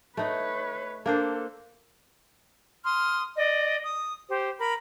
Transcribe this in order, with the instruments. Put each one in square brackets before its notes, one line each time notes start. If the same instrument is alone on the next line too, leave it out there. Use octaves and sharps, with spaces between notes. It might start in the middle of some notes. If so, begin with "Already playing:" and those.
[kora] A3 D#4 [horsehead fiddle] B4 C#5
[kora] A#3 D4 C5 [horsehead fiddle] A4
[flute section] C6 D#6 F6
D5 D#5
D#6
G4 C5
A#4 B5